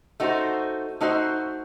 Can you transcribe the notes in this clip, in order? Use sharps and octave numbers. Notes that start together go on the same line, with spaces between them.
A3 D#4 F#4 C5
A3 D#4 F#4 C5